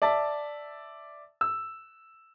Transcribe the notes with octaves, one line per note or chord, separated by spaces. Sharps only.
D5 E5 A5
E6